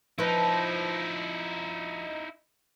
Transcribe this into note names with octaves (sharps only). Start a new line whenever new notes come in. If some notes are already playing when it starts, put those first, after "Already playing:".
F3 D#4 E4 B4